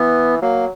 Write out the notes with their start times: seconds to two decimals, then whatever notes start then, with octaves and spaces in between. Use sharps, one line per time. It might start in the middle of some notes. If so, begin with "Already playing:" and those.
Already playing: E3 B3
0.42 F#3 A#3